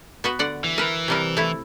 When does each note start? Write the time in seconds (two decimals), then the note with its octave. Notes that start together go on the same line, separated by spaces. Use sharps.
0.24 B3 F#4 B4
0.39 D3 D5 F#5
0.64 E3
0.78 A#4 B4
1.08 C3 G3 A#4
1.37 A3 E4